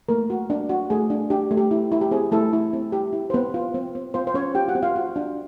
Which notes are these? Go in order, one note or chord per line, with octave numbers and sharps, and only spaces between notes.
A3 A#3 A#4
F#4
D4
F#4
A3 G#4
D4
D4 G4
A3
G4
E4
E4
G4
C4 G#4
A3 E4 A4
E4
C4
G4
E4
C5
B3 C4 B4
F4
C4
C4
C4 F4 C5
C5
C#4 F4 C#5
F4 G4 G5
F#4 F#5
C4
F4 F5
F#4
D4